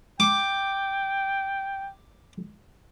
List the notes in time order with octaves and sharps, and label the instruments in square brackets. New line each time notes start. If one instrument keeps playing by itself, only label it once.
[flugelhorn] G5 [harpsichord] D6